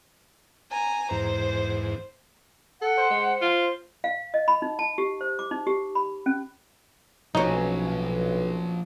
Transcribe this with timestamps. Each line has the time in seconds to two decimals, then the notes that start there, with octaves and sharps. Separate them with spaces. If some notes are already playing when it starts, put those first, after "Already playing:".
0.71 G#5 A#5
1.11 E2 G#2 C5
2.81 A4 F#5
2.97 C5
3.10 G#3
3.41 F4
4.04 F5
4.34 D#5
4.48 B5
4.62 D#4
4.79 A5
4.98 G4
5.21 C5
5.39 D6
5.51 D#4
5.67 G4
5.95 B5
6.26 C#4
7.35 B1 F3 F#3 A#3 C#4 D#4